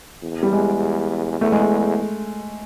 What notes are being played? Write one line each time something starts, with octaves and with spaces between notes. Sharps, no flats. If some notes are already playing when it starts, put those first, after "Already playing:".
E2
G3
G#3
E2 A3
G#3